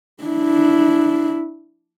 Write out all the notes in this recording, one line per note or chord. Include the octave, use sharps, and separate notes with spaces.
D4 E4